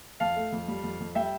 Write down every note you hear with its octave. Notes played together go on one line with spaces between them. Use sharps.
F2 F5 A5
A3
F2
G3
F2
F2
G3 E5 G5